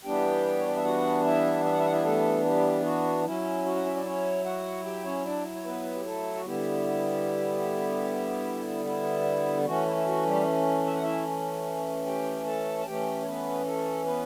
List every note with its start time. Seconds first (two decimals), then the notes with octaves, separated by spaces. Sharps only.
0.04 E3 G3 B3 D4 G4 G5
0.59 C#5
0.67 D5
0.76 E5
0.84 F#4 F#5
1.25 E4 E5
1.64 E5
1.72 F#5
1.79 E5
1.86 F#5
1.93 E4 E5
2.05 A3 A4
2.45 G3 G4
2.85 F#4
3.25 F#3 C#4 E4
3.65 F#4
3.75 F#5
3.86 E5
3.95 D5
4.05 C#4 C#5
4.45 F#4 F#5
4.85 G4 G5
5.05 C#4 C#5
5.25 D4 D5
5.55 C#5
5.65 B3 B4
5.94 G4
6.06 A3 A4
6.34 F#4
6.45 D3 G3 B3 E4 G4
8.86 E4
9.65 E3 A3 C#4 F#4
9.85 E4
9.96 E4
10.06 F#4
10.25 G3 G4
10.86 E5
10.94 F#5
11.03 E4 E5
12.06 G4 G5
12.46 A4 A5
12.79 A5
12.86 E3 A3 C#4 G4 G5
13.22 C#5
13.26 B3 B4
13.66 A3 A4
14.06 B3 B4